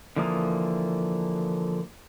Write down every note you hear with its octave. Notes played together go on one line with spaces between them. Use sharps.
D3 E3 F3 A#3 D#6